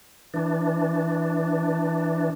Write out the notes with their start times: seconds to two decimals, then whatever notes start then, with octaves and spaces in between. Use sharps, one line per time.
0.34 E3 D4